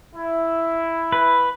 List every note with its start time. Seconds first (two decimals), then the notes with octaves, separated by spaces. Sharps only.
0.15 E4
1.12 B4